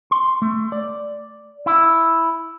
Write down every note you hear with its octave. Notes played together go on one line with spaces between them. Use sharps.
C6
A3
D5
E4